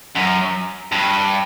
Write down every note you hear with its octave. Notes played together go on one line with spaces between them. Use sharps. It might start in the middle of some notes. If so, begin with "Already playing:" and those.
F#2
G2